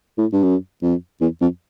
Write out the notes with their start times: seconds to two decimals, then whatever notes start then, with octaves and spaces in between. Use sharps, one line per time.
0.18 A2
0.32 G2
0.43 F#2
0.82 F2
1.21 E2
1.41 F2